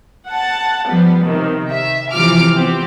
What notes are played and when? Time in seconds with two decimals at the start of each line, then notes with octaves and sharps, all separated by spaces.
0.28 F#5 A5
0.88 F3 G3 B3
1.24 C3 D#3
1.71 E5
2.11 C3 E3 F3 F4 D6 F6
2.55 B3 C4 G4